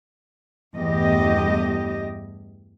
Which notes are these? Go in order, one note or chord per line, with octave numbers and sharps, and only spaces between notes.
E2 G2 A3 G4 D#5